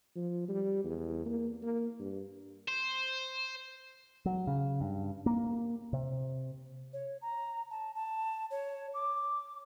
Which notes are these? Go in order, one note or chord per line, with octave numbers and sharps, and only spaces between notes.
F3
G3
E2
A#3
A#3
G2
C5
F#3
C#3
G2
A#3
C3
C#5
A#5
A5
A5
C#5
D6